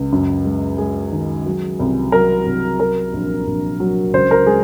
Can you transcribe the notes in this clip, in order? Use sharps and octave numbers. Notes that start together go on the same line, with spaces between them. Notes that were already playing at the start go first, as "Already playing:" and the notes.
Already playing: C#2
F#2
G#3
G#3 G#4
D#3
F#3
C2
F#3 A#4
C2
F#3 A#4
A#1
A#1
F#3
C#2 C5
A#4
G#3 G#4